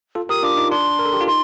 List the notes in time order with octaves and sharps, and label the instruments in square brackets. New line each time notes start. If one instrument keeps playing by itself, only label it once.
[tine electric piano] F4 A4
[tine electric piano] G4 A#4 [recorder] D#6
[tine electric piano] D4 F4 [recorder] D6
[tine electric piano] D#4
[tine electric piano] D4 [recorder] C6
[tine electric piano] A#4
A4
G4
F4
[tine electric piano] D#4 [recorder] C6